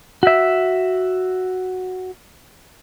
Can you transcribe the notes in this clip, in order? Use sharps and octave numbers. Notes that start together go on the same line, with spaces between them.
F#4 E5